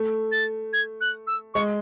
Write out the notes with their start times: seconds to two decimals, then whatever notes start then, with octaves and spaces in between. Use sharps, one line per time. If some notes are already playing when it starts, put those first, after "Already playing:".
Already playing: A3
0.32 A6
0.73 G#6
1.01 F#6
1.27 E6
1.54 G#3 C#6